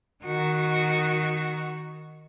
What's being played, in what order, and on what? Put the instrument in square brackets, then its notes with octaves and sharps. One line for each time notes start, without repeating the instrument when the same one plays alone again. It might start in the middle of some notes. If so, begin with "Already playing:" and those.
[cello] D#3 F#4